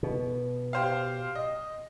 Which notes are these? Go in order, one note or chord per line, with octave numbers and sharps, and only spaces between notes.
B2
G4 C5 F5
D#5